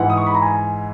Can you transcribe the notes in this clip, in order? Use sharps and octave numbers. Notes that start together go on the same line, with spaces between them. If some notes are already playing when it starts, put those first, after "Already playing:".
Already playing: G#2 E3 F#5
D#6
C#6
B5
A#5
G#5